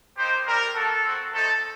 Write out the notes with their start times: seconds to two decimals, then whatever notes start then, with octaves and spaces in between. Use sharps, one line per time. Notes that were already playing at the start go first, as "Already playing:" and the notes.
0.17 A#3 D#4 G4 C5
0.46 G3 C4 G4 A#4
0.75 A#3 F#4 A4
1.04 C4 F#4
1.32 A3 C4 D#4 A4